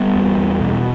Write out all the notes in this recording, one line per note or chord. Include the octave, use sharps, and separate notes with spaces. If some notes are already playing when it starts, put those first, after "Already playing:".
Already playing: G3 B3
E2
E2
B2